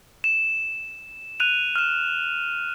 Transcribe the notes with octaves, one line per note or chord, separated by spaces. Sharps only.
E7
F#6 D#7 F7
F6 E7